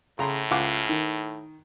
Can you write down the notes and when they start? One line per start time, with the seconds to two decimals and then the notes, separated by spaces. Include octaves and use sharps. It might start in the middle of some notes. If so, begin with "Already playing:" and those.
0.19 A2 C#3 A#5 C6
0.51 C#2 F#5 D6
0.89 D#3